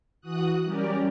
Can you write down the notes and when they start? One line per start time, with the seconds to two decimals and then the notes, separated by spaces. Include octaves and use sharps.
0.21 E3 F#4 D#6 F#6
0.63 G3 C#4 G4 A#4 D5